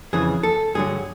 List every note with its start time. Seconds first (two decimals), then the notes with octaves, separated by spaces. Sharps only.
0.13 F2 C#3 E3 G#4
0.43 A4
0.74 G2 D3 F#3 G#4